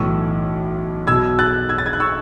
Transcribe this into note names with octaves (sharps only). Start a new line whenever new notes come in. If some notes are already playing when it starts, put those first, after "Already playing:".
Already playing: B1 A2 E3 C#6 E6
B1 B2 E6 G#6
F#6 A6
E6 G#6
A6
G#6
F#6
C#6 E6